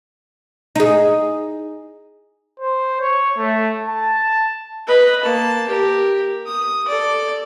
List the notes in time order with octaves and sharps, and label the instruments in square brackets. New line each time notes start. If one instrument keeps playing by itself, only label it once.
[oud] D#4 G#4
[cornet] C5
C#5
A3
A5
[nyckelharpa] B4 D#5
A#3 A5
G4 A#4
D#6
A4 D5